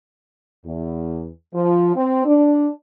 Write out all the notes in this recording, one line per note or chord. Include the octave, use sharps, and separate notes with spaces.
E2
F3
C4
D4